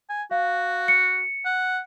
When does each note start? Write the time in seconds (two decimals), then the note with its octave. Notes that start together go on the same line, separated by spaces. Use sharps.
0.09 G#5
0.31 F#4 F5
0.88 C#7
1.45 F#5